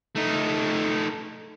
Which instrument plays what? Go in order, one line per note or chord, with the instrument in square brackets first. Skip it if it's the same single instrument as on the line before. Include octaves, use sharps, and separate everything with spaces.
[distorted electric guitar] A3 D#4